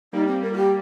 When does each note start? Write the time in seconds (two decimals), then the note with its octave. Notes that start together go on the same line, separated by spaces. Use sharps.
0.13 G3 A#3 D#4
0.27 C4
0.42 A#4
0.53 F4
0.57 G4